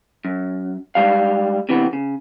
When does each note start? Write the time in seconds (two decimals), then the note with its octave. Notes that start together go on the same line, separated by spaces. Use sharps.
0.25 F#2
0.95 G#2 D#3 G3 F5
1.69 C3 E3 B3
1.93 C#3